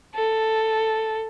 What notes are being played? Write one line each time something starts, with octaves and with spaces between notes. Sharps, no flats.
A4